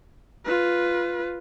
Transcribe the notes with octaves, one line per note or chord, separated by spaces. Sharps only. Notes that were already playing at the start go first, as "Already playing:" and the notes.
F4 B4